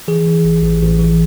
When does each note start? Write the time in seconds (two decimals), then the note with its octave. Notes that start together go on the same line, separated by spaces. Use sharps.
0.08 E3 G#4
0.27 E3
0.45 A1
0.63 A1
0.82 A1
0.99 E3